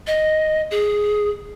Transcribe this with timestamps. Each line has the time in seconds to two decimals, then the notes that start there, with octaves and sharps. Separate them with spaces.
0.07 D#5
0.71 G#4